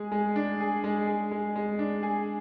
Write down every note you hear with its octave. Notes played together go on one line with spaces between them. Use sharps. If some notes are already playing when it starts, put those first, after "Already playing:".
Already playing: G#3 G#4
G#3
D4
G#4
G#3
G#4
G#3
G#3
D4
G#4